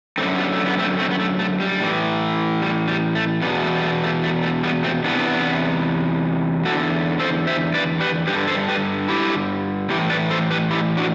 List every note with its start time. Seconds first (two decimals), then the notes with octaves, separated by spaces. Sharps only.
0.18 F#2 D3 A3 C4
0.38 G3 B3
0.53 A3
0.66 B3
0.78 A3 C4
0.99 A3 C4
1.11 B3
1.19 A3
1.39 A3
1.60 G3
1.80 A2 E3
2.62 G3
2.88 G3
3.15 A3
3.41 E2 G3 B3
3.46 B2
3.62 A3
3.75 G3
3.83 A3
4.03 A3
4.23 A3
4.43 A3
4.63 G3 B3
4.83 A3 C4
5.04 E2 C3 E3 B3 D4
6.65 E2 D3 F#4 A4
7.19 A4 C5
7.47 C5 E5
7.74 B4 D5
8.00 G4 B4
8.27 G2 D3 G4 B4
8.48 A4 C5
8.69 G4 B4
9.08 E4 G4
9.90 A2 E3 E4 G4
10.10 B4 D5
10.30 A4 C5
10.51 G4 B4
10.71 E4 G4
10.97 D4 F#4